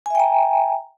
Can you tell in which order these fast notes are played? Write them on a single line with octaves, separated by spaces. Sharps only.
G#5 E5 G5 A#5